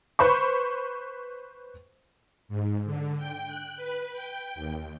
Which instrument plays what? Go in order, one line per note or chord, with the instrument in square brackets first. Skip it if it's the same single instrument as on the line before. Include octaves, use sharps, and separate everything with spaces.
[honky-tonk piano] B4 C5 B5 C#6
[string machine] G#2
D3
G5
F#6
B4
G5
D#2